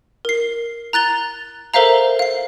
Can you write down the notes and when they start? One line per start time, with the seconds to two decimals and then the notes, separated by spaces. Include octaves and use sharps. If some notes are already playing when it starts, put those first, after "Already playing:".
0.25 A#4 C7
0.93 A#5 F#6 A6 G7
1.74 A4 A#4 C5 E5 F5 A#5
2.19 F5 C7